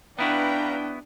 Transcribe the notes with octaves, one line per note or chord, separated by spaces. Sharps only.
B3 D4 E4 F#4 B4 F5 G5 A#5